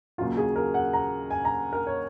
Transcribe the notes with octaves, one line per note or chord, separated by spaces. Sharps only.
D#2 C#3 F#3 F4
G#4
A#4
F#5
A#5
G#5
A#5
A#4
C#5